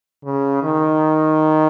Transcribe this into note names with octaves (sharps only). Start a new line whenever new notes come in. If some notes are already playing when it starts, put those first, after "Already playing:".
C#3
D#3